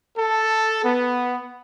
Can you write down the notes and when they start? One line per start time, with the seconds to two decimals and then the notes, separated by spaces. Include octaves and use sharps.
0.17 A4
0.84 B3